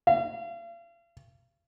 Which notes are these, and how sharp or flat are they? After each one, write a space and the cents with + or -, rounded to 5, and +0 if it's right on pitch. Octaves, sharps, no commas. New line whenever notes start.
F5 -40